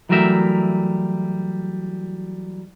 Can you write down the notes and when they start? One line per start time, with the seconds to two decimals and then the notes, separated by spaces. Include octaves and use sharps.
0.09 E3 F#3 G3 A3 A#4 E5